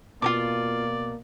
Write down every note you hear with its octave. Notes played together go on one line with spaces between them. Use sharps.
B2 A#3 F4 A#4 D5 D6